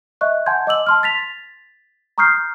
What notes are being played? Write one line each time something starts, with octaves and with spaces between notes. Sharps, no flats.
D#5 E5 C#6 F#6
F#5 G#5 A5 C6 G6 G#6
D#5 D6 E6 F#7
A5 C6 F6
A6 B6 F7
A#5 C#6 D#6 F6 G6 C7